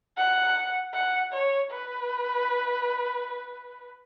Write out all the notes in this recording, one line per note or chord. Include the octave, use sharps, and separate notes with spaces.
F#5
F#5
C#5
B4